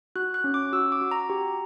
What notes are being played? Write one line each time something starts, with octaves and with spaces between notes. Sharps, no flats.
F#4 F#6
F#6
C#4
D6
F#4 E6
D6
F#4
A#5
G4